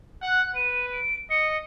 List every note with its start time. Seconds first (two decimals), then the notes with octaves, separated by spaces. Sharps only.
0.22 F#5 F#6
0.55 B4 D#7
0.93 D7
1.30 D#5 C#7